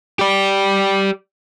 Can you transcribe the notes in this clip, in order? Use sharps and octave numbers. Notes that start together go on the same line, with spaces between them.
G4 D5